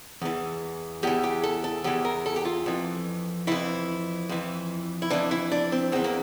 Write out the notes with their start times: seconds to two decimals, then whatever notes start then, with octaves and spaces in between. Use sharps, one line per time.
0.22 E2 E3
1.03 E2 E3 G4
1.24 G4
1.43 A4
1.64 A4
1.84 E2 E3 G4
2.05 A#4
2.26 A4
2.36 G4
2.45 F4
2.66 F2 E3
3.47 F2 E3 E4
4.29 F2 E3
5.02 E4
5.10 F2 E3 D4
5.31 E4
5.52 D4
5.72 C4
5.92 E2 E3 C4
6.04 A#3